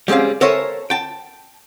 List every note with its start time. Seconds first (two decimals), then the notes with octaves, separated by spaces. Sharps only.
0.08 G3 G#3 C4 C#4 F5
0.41 A4 A#4 C5 C#5 E5 G#5
0.90 G5 A5